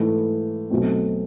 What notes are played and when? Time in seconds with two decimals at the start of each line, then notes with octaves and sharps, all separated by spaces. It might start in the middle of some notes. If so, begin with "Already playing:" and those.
Already playing: G#2 E3 A3
0.70 B1 B2 A3 C4